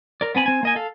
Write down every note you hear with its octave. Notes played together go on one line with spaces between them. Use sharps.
A#4 D5
B3 C4 G#5 B5
C4 G#5
A#3 D#5 G#5
A4 F5